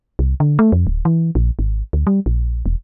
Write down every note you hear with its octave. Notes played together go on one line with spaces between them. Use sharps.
C2
D3
A3
F2
D1
E3
A#1
G#1
D2
G3
A#1
E1